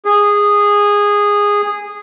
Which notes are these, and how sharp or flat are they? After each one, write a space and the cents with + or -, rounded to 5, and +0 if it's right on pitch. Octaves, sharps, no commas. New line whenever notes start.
G#4 -15